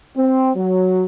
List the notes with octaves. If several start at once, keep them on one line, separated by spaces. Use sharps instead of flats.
C4
F#3